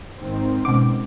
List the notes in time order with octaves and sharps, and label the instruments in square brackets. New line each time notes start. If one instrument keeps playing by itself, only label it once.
[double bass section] G#1 D#3 C4
[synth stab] B2 D6 [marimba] G#3 C#4